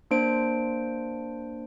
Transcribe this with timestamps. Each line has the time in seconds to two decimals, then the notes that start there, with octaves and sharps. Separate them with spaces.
0.11 A#3 D4 C5 D7